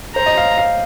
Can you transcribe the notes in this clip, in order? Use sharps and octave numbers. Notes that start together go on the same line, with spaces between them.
C5 A#5
D#5
F5
F5